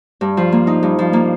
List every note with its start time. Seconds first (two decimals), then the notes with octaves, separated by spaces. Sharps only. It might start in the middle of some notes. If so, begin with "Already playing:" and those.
0.21 G2
0.37 F3
0.52 A#3
0.67 D#4
0.83 G2
0.99 F3
1.13 A#3